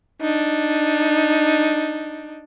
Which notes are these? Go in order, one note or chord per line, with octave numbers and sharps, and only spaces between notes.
D4 D#4